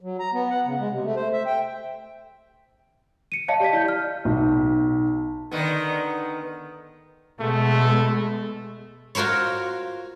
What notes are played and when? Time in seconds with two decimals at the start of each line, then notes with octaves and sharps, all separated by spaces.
0.01 F#3
0.19 A#5
0.34 B3
0.50 F#5
0.66 C#3
0.79 G#3
0.91 C3
1.04 A3
1.16 C5
1.33 E5
1.46 G5
3.32 C#7 D#7
3.48 C#5 D#5 F5 A5
3.60 G4 D5 A5 B6
3.73 E4 D5 G6
3.88 F6
4.25 B1
5.51 D3 D#3 B3
7.40 B2 G#3 A3
9.15 F4 F#4 A#4 C5 C#5